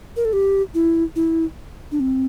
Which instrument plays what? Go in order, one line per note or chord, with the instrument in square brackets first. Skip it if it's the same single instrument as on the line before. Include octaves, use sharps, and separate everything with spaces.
[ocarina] A#4
A4
G4
E4
E4
D4
C4